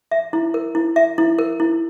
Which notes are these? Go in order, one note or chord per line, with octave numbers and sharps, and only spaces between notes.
E5
E4
A#4
E4
E5
E4
A#4
E4